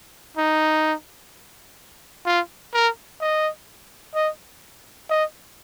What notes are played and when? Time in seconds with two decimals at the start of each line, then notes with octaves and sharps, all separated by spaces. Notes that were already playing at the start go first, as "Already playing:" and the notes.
0.37 D#4
2.26 F4
2.74 A#4
3.21 D#5
4.15 D#5
5.10 D#5